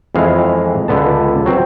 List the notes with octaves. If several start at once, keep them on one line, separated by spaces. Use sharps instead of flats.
F2 E3 G#3 F5
C#2 D3 B3 A5
F#3 C4